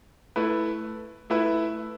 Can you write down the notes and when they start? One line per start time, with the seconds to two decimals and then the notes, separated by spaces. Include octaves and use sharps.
0.36 A3 E4 B4
1.30 A3 E4 B4 E5